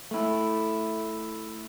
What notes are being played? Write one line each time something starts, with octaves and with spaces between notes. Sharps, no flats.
A3 E4